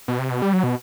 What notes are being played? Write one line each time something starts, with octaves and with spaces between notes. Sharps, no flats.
B2
C3
B2
G3
F#3
B2